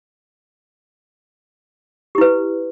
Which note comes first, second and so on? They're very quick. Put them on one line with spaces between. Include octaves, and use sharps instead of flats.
G4 E4 B4